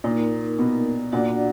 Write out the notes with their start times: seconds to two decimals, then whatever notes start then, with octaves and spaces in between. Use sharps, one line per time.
0.04 A#2 A#3 D#4 A#4
0.59 B2
1.12 A#2 D4 F#4 D5 F#5